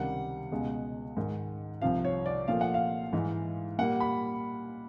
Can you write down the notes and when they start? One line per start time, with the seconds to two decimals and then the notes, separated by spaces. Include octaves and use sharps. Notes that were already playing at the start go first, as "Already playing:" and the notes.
Already playing: C#2 C3 D#3 G3 F#5
0.51 C#2 B2 G#3
1.17 G#2 D#3 G#3
1.82 C2 C3 F3 F5
2.05 C#5
2.26 D5
2.48 A#2 F3 A3 F5
2.61 F#5
2.74 F5
3.13 G#2 E3 G#3
3.78 A#2 G3 A#3 F#5
4.00 B5